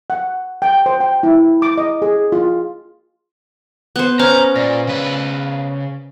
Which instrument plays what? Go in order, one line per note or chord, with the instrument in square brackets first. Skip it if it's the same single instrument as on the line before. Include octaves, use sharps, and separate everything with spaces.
[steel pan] F#5
G5
C5
G5
E4
D6
D#5
G#4
F4
[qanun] B3 C5 [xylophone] F#6
[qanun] C#4 [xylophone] B4 C5 F6 [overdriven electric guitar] A#5
[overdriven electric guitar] A#2 [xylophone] D5 A#6
[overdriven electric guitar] C#3 B4